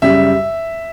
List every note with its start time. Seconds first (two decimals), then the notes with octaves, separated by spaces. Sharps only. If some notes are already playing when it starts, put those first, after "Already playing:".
0.02 F#2 C#3 G3 E5